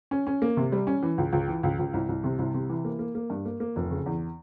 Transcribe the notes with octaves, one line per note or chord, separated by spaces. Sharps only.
C#4
C#4
A#3
C3
G3
C#4
E3
C#2
C#2
E3
C#2
C#2
C2
C2
C3
C2
C3
E3
A#3
A#3
A#3
G2
A#3
A#3
F1
C#3
E2